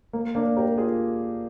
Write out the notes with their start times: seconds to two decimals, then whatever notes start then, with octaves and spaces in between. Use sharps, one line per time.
0.13 A#3
0.35 A#3 D4
0.56 G4 A#4
0.77 F4 G#4